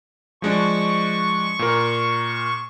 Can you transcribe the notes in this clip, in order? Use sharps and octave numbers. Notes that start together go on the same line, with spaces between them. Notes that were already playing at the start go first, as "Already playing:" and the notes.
F3 G#3 D4 C#6
A#2 A#4